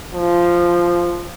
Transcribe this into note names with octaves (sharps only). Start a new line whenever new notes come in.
F3